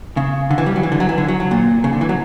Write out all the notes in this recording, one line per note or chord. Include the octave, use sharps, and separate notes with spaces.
C#3
D3
E3
G3
F#3
E3
D3
F#3
E3
D3
F#3
F#3
A#2
C#3
D3
E3
F#3